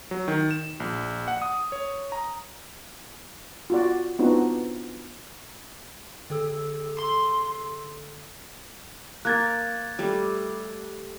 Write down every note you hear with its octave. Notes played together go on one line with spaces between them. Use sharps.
F#3
D#3
E7
A#1
F#5
D#6
C#5
A#5
F4 F#4 D5
B3 C4 D4 D#4 F4 F#4
D3 A4 E6
C6
A#3 A#4 F#6 G#6 A6
G3 A3